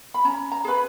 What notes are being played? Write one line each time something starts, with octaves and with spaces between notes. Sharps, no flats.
B5
C#4 A#5
A#5
G#4 B4 B5